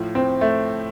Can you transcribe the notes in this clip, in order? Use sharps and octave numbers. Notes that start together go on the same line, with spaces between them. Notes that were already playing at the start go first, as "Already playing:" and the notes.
Already playing: A2 F3
C4
A3